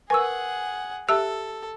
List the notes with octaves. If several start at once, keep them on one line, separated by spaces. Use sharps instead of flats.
G#4 A#4 B4 F#5 G#5 C#6 E6
G4 A4 E5 A5 E6